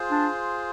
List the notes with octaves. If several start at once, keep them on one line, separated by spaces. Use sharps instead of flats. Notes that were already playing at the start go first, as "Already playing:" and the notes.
Already playing: F4 G#4 C5
D4